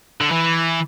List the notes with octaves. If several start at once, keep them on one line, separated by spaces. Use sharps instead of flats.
D3
E3